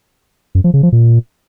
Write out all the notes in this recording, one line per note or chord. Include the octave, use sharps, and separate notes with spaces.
F#2
F3
C#3
F3
A#2